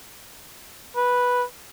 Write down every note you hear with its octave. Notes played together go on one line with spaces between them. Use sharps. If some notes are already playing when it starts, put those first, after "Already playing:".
B4